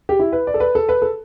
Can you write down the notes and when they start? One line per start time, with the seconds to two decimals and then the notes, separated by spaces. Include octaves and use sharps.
0.09 G4
0.19 E4
0.32 B4
0.47 D5
0.54 A4
0.60 B4
0.75 A4
0.89 B4
1.02 A4